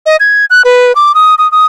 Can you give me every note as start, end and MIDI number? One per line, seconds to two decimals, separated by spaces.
0.06 0.16 75
0.20 0.45 92
0.50 0.62 90
0.65 0.95 71
0.95 1.14 86
1.15 1.35 87
1.38 1.50 87
1.52 1.66 87